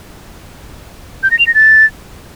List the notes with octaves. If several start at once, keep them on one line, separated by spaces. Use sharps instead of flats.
G6
A#6
F7
A#6
A6